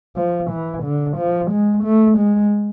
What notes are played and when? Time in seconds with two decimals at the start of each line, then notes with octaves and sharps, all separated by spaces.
0.17 F3
0.51 E3
0.84 D3
1.17 F3
1.51 G#3
1.84 A3
2.18 G#3